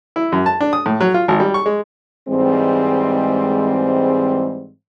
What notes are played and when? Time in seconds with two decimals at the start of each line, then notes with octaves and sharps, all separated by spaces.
0.16 E4
0.32 F#2
0.46 A5
0.61 D4
0.73 D#6
0.86 A2
1.00 F#3
1.14 F4
1.28 G#1
1.40 G3
1.54 C#6
1.66 G#3
2.28 G#2 E3 G3 G#3 C4